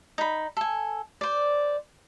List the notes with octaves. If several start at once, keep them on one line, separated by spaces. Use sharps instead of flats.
D#4 B5
A4 G#5
C5 D5